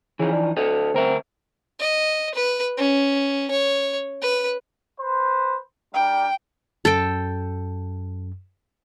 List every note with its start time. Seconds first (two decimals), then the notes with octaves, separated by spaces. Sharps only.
0.20 C#3 E3 F3 D#4
0.32 D4
0.57 D2 A4 C#5 D#5
0.94 D2 C4 A#4 E5
1.80 D#5
2.35 B4
2.77 C#4
3.51 C#5
4.22 B4
5.00 B4 C5
5.94 G3 D4 A#4 G5
6.85 F#2 A4 G5